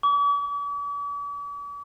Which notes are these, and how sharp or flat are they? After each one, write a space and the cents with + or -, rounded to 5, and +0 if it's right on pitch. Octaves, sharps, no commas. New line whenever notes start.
D6 -45